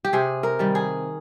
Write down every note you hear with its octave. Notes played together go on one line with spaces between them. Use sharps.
G4
C3 G#4
A#4
D#3 G3
G#4